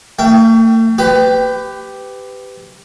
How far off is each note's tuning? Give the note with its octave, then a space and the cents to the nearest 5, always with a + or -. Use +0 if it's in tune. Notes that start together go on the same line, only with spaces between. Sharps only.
A3 +45 G5 -10
G4 +0 B4 +25